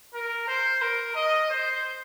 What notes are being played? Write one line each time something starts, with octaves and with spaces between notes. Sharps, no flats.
A#4
C5
A#4
D#5
C5